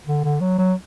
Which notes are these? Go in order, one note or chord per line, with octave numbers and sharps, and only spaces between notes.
D3
D3
F#3
F#3